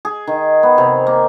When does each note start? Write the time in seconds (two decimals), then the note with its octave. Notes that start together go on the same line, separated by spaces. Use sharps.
0.05 G#4
0.27 D#3
0.63 B3
0.78 C3
1.07 A#3